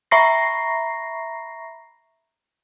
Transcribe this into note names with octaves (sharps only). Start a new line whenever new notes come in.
E5 A#5 B5 C#6 A#6 C7